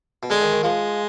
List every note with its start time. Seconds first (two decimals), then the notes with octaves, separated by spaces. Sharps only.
0.23 B2
0.30 D3 G#3
0.41 D#3
0.52 D#3
0.63 F3 G#3